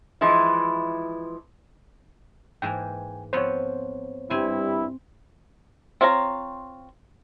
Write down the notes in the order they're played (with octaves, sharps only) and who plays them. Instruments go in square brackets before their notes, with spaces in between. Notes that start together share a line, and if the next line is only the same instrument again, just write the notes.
[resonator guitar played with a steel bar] E3 F3 G#3 E4
[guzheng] G#2 E3 A#3 [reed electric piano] G5 G#5
[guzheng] F3 B3 C4 [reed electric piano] C5 C#5
[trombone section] G2 G3 E4 [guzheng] C4 G#5
[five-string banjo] C4 F4 C#5 D#5 A#5